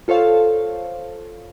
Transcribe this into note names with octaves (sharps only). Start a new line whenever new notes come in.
F4 A4 C5 C#5 F5